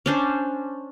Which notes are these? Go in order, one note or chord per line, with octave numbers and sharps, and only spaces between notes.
C#4 D4 C5